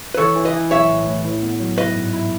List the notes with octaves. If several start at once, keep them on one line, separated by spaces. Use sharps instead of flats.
B4
E3 A4 C#5
E3
B4 D#5
E3
B1 C#5 E5
A2
A2
E4
B3
F#3
E4 B4 D#5
G#2
E4